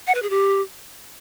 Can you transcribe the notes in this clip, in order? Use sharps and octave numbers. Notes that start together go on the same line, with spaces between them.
F#5
B4
G#4
G4